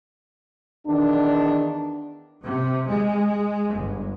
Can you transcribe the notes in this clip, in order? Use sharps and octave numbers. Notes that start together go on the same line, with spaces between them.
E2 D#3 D4
C3
G#3
G1